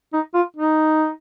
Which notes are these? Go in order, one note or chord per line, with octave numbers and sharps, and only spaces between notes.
D#4
F4
D#4